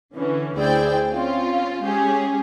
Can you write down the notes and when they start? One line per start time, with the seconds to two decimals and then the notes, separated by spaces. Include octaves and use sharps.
0.14 D3 E3 C#4
0.56 D2 E4 G#4 C5 D5 G5
1.12 C4 C#4 F4
1.82 G#3 C#4 G4 G#4